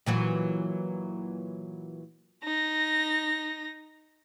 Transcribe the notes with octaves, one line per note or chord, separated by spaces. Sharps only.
A#2 E3 F#3
D#4 A#6